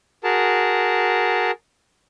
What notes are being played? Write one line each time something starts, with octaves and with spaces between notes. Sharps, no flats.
F#4 G#4 A#4 A5